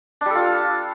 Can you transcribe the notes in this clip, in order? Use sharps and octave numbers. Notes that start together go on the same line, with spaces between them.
G3 D4 F4 A4